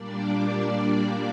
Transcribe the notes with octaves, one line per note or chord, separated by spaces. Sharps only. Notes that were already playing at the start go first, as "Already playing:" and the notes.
Already playing: A#2 G3 A#3 D4 D5